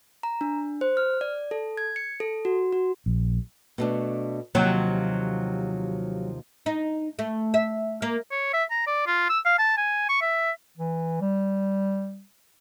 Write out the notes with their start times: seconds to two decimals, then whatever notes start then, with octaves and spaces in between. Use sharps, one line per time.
0.23 A#5
0.41 D4
0.81 C5
0.97 F6
1.21 D5
1.51 A4
1.77 G#6
1.96 C#7
2.20 A4
2.45 F#4
2.72 F#4
3.06 A#1
3.78 B2 A3 D4
4.55 D#2 C3 F3 F#3
6.66 D#4
7.19 A3
7.54 E5
8.02 A#3
8.31 C#5
8.54 E5
8.71 A#5
8.87 D5
9.07 F4
9.29 E6
9.45 F5
9.58 A5
9.77 G#5
10.09 C#6
10.21 E5
10.77 E3
11.21 G3